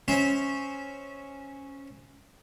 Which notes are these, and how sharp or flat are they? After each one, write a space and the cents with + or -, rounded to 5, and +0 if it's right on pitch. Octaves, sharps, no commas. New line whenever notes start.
C#4 -5 C5 +0 E5 -25